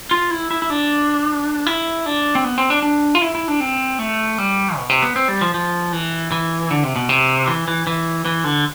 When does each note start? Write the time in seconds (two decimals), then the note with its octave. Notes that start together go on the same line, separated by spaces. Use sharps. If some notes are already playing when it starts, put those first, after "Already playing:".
0.11 F4
0.31 E4
0.51 E4
0.62 E4
0.70 D4
1.67 E4
2.06 D4
2.35 C4
2.44 B3
2.58 C4
2.70 D4
2.83 D4
3.15 F4
3.22 E4
3.35 E4
3.48 D4
3.60 C4
3.99 A3
4.38 G3
4.77 B2
4.89 C3
5.02 B3
5.16 C4
5.28 G3
5.41 F3
5.54 F3
5.92 E3
6.32 E3
6.71 D3
6.83 C3
6.96 B2
7.09 C3
7.47 E3
7.68 E3
7.87 E3
8.25 E3
8.44 D3